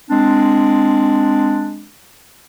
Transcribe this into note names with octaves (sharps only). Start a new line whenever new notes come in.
G#3 C4 D4